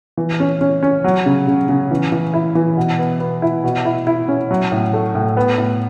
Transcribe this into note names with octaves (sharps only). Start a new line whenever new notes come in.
E3
C#4
C#4
C#4
F#3
C#3
C#3
C#3
E3
E3
E4
E3
B2
B3
B3
E4
B2
E4
E4
C#4
F#3
A2
A3
A2
B3
A2